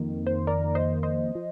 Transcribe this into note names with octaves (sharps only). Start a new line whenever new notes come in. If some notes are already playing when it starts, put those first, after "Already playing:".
Already playing: F2 D#3 A#3
C5
A#4 D5
C5 D#5
C5 D#5
F3